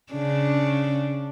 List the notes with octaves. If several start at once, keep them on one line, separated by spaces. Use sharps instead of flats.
C#3 D4